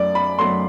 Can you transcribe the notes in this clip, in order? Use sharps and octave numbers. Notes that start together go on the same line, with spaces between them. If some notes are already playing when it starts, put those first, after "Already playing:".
Already playing: F#2 F#3 A3 D5
B5
F#2 F#3 A3 C6